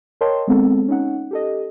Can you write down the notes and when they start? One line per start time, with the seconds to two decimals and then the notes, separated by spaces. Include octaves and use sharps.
0.21 A#4 C#5 D#5 G5 A5 C6
0.48 G#3 B3 C4 A4
0.88 C#4 D#4 F#5
1.31 G4 A4 D#5